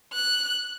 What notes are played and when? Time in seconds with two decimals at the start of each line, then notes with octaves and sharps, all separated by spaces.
0.13 F#6